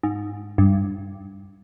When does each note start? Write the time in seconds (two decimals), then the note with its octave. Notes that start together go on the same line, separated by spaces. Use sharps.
0.03 G#2
0.58 G2